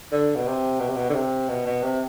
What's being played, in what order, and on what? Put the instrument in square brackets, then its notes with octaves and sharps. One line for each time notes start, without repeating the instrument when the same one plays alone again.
[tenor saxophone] D3
B2
C3
B2
C3
B2
D3
C3
B2
B2
C3